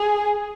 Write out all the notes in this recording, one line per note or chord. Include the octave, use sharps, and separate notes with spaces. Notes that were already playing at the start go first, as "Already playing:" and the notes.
Already playing: G#4